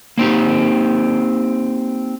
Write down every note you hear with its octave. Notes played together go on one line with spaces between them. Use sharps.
A#3 C4 D#4 G4